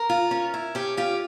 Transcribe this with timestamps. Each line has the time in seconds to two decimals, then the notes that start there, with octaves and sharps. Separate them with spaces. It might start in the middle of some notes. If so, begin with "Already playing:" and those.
Already playing: A#4
0.09 F4
0.31 C#4
0.54 E4
0.75 C#4 G4
0.97 F4 G4